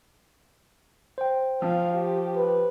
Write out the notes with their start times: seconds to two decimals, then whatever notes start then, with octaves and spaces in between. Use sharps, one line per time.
1.18 C5 G5
1.62 F3 F5
1.94 G4
2.36 B4